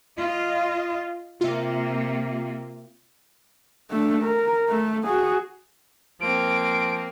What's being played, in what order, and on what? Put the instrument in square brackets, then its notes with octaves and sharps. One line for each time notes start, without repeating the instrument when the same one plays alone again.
[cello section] F4 D#5
[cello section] C3 A#3 [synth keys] F4 E5
[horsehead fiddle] A3 D4
A#4
A3
F#4 G#4
[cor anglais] F3 [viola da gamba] A#3 C4 [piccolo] D7